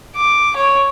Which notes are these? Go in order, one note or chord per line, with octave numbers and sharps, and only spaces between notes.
D6
C#5